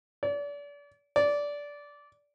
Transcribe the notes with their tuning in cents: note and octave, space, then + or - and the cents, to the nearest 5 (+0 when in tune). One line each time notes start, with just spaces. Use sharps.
D5 -35
D5 -15